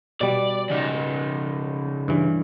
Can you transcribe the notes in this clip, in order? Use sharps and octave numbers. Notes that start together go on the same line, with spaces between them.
B2 G3 D5
C#3 D#4
G2 E3